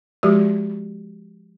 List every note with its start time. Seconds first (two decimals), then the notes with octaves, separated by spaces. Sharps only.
0.23 F3 G#3 F#4 G4